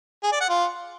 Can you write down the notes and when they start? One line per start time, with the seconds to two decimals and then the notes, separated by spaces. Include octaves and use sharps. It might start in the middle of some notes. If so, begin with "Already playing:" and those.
0.23 G#4
0.32 D5
0.41 F#5
0.49 F4